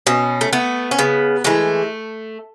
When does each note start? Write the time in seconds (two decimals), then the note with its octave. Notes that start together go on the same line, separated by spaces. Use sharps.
0.07 B2 C#4
0.41 A3
0.53 A3 B3
0.91 C#4
0.99 C#3 B3
1.44 E3 G#3 A3